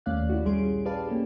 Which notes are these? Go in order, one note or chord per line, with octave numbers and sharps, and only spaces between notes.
D#2 A3 C#4 D5 F5 F#6
E4 F#4
A#1 G3 C#4 G#4 C6 D7
G4 G#4 B4 D5 F5 A5
A#3 C#4 G4 A4